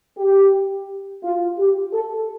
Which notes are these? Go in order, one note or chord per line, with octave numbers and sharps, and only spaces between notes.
G4
F4
G4
A4